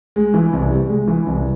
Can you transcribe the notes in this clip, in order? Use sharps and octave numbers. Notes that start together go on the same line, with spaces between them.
G#3
E3
C2
C3
G#3
E3
C2